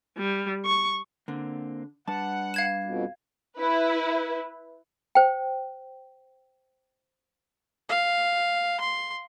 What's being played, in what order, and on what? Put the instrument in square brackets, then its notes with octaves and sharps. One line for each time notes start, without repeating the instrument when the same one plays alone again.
[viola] G3
C#6
[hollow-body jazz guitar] D3 [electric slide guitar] A#3 C4
[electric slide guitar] G3 D4 B4 [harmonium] F#5 [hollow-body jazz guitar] A5
[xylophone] F5 G#6 E7
[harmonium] F2 B2
[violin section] E4 B4
[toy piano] C5 G5
[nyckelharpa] F5
C6